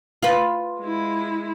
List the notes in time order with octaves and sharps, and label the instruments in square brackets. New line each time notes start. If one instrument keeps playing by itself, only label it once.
[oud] F4 B4
[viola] G#3 E4